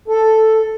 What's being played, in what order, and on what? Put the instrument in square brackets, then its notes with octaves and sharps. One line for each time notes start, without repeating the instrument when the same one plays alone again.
[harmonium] A4